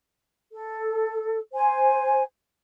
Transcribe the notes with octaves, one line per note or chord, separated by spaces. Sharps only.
A4
C5 G#5